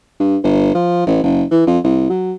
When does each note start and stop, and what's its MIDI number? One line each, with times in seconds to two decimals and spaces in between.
0.20 0.37 43
0.43 0.74 31
0.74 1.05 53
1.07 1.18 33
1.23 1.43 30
1.51 1.63 52
1.67 1.79 41
1.84 2.08 36
2.10 2.34 54